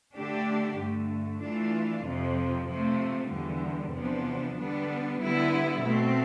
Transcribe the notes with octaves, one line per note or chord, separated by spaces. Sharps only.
D3 A3 D4 G4
G2 D3 A3
E3 A3 D4 F4
F2 C3 F3
C3 F3 A3
E2 D3 G3
E2 C3 F3 B3 D4
D3 G3 B3 D4
D3 G3 B3 E4
B2 A3 C4